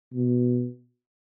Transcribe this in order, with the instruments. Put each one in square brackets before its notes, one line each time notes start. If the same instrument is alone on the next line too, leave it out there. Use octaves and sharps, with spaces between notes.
[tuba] B2